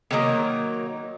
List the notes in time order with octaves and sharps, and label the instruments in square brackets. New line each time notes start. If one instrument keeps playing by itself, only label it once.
[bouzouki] C3 D#3 F#3 A#3 A#5